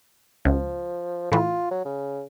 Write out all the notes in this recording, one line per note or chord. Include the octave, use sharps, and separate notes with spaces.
C#2 F3
A2 E3 F4
F#3
C#3